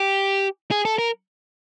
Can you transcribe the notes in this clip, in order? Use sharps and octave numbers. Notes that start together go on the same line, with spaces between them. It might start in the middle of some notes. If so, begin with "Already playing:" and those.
Already playing: G4
G#4
A4
A#4